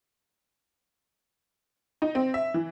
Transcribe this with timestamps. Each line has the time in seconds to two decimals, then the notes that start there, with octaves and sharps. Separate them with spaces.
2.02 D#4
2.15 C4
2.34 E5
2.54 E3